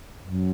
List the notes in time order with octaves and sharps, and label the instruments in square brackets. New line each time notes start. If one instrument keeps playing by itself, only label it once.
[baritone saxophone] F#2